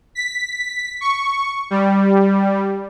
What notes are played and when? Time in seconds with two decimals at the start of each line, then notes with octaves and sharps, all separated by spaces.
0.15 B6
1.01 C#6
1.71 G3